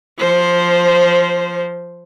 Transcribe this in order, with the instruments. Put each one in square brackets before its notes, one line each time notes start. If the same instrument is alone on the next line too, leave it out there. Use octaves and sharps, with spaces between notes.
[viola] F3 C5